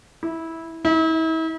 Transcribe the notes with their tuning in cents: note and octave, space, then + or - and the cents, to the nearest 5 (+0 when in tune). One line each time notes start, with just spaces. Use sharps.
E4 -15
E4 -40